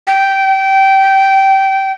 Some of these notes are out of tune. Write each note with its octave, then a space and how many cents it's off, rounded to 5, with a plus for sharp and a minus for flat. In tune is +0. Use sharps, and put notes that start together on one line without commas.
G5 -20